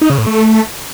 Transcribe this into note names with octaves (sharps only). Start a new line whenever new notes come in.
D#4
C#3
A2
A3